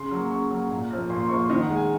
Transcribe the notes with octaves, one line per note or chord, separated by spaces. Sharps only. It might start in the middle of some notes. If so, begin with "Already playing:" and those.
Already playing: C#3 C6
F#3 A#3
C#3 C#6
F#3 A#3
A#2
F3 A#3
A#2 C6
C6
F3 A#3 C#6
C6
D#3 D#5
F#5
G#3
G#5